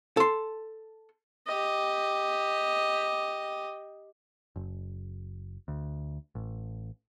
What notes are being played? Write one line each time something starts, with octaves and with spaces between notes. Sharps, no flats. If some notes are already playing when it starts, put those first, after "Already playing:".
A4 C6
G4 D#5
F#1
D2
A1